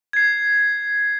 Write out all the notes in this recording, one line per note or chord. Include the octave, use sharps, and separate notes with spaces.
G#6 C7